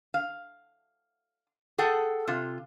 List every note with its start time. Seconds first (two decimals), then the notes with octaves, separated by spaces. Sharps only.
0.14 F5
1.78 G#4 A4 F#5 G5
2.28 C3 F4